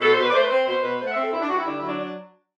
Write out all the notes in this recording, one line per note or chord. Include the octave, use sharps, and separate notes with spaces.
B2 A4
C5
B2
B4
D5
A3 C5
B4
C4 C5
B2 C5
B2 B4
A3 C5
F#5
E5
C4
A4
G2 E4
D4
G2 F#4
E4
D3 D4
E4
F#3
D4
D4